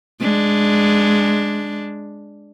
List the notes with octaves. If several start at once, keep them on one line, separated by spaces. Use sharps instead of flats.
G#3 D4